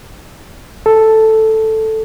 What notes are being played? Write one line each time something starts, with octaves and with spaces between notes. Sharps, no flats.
A4